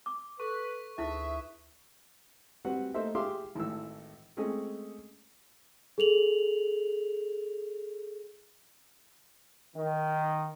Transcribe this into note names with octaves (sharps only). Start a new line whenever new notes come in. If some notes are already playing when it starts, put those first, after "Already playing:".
D6
A4 B4 C#6
D2 D#4 E4 G#4 B4 E5
G3 C4 F#4 B4 F#5
A3 A#3 D#4 C5 E5
G4 G#4 E5 F5 C6 D6
G#1 A2 E3 E4 E6
G#3 A3 C4 C#4 G#4 D#5
G#4 A4 F7 F#7
D#3